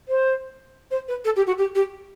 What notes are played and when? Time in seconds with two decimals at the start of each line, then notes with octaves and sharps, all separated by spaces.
0.08 C5
0.91 C5
1.08 B4
1.24 A4
1.36 G4
1.47 F#4
1.58 G4
1.75 G4